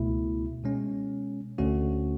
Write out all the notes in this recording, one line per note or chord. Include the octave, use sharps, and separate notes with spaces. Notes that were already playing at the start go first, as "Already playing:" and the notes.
Already playing: C#2 B2 A3 E4
B2 G#3 C#4
D2 D3 A3 C#4 F#4